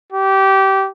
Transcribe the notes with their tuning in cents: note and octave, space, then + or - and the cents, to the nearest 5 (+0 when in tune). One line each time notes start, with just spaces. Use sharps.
G4 -20